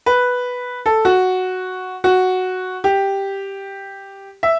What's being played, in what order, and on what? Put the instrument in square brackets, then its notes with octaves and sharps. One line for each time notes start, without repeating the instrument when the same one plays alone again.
[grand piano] B4
A4
F#4
F#4
G4
E5